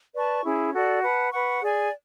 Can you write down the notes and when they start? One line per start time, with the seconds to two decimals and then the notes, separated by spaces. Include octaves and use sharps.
0.14 B4 D5 A5 C#6
0.44 C#4 E4 G#4
0.73 F#4 A4 D5
1.02 B4 F#5 A5
1.31 B4 F#5 C#6
1.61 G#4 D5 G#5